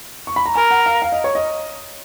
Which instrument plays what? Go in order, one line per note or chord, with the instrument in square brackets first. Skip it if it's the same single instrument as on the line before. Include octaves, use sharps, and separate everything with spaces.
[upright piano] C#6
B5
A#5
[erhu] A#4 [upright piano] G#5
[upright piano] F#5
F5
F5
D#5
C#5
D#5